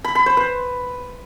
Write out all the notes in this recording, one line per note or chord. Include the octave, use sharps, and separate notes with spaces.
B5
B5
C5
B4